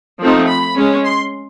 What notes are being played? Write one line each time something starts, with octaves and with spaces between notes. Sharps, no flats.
F3 A3 C4 D#4
B5
G#3 C#4
C6